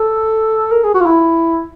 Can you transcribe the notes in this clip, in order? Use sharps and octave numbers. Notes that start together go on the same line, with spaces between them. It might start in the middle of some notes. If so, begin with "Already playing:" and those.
Already playing: A4
A#4
G#4
F#4
F4
E4